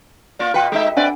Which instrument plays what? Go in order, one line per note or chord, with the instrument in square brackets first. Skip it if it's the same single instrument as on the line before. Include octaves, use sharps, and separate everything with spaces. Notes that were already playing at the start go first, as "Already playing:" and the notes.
[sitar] A#3 F4 D5
[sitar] B2 F4 B4 [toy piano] F#4 G5
[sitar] G#3 D#4 E5 [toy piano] A4
[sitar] C4 B4 D5 [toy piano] D4 F#5